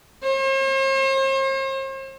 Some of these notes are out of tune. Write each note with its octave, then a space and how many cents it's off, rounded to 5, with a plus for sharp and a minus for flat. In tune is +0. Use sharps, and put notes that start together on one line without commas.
C5 +45